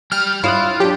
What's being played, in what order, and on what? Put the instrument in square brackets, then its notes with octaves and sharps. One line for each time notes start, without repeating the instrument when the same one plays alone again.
[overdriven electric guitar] G3 G5 [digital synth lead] F6
[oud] E4 [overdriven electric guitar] F4 [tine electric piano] F5 D#6 F#6
[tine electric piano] F#3 D4 [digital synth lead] G4